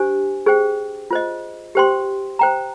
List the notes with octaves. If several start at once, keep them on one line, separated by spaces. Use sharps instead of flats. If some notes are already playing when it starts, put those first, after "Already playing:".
Already playing: D4 G4 C5 G#5
G#4 C5 G5
F4 C5 D#5
G4 C5 G5 C6
C5 G5 A#5